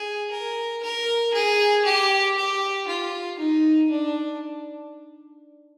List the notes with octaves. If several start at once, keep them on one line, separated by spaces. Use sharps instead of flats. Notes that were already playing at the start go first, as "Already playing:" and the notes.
Already playing: G#4
A#4
A#4
G#4
G4
G4
F4
D#4
D4